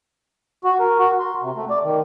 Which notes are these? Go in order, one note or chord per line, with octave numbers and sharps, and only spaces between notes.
F#4
A#4
F#4
C6
C3
A3
D5
D#3